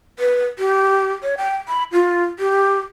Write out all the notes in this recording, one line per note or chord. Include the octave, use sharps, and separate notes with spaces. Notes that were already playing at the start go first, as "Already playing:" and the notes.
B4
G4
C#5
G5
B5
F4
G4